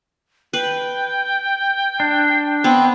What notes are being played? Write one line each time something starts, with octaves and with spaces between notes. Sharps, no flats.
B4 G5
D4
B3 C4